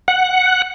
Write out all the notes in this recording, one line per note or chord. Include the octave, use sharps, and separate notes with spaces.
F#5